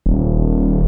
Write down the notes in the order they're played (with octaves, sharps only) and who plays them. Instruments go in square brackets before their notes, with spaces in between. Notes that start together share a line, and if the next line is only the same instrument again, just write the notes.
[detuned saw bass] D#1